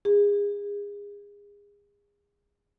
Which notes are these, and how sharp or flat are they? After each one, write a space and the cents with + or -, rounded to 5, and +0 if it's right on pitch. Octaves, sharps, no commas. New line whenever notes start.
G#4 -30